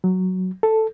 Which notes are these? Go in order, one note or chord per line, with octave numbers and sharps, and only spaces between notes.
F#3
A4